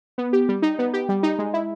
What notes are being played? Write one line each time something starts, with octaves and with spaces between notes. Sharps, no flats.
B3
G4
G3
D#4
B3
G4
G3
D#4
G#3
E4